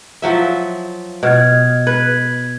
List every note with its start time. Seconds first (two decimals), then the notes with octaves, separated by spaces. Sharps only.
0.22 F3 F#3 E5
1.23 B2 D#5 F6 G#6
1.87 B4 G#6